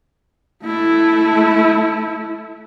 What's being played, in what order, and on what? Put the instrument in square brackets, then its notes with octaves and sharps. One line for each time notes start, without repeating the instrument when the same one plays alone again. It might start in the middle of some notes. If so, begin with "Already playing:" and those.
[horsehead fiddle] A3 E4